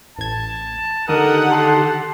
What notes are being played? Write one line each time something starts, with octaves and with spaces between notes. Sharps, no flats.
A1 A5 G#6
D3 D#3 D#4 G4 A4 A#4 F#5 D#6
A5 C6